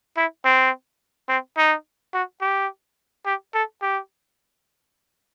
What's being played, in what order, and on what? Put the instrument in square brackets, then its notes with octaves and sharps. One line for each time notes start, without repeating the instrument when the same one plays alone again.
[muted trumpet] E4
C4
C4
D#4
F#4
G4
G4
A4
G4